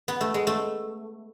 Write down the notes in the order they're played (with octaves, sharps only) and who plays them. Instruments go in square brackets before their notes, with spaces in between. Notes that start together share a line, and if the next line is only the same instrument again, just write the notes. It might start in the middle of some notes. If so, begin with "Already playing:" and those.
[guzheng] B3
A3
G#3
A3